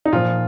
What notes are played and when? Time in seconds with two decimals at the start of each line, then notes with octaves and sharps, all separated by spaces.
0.05 D#4
0.13 A#2 F3 F4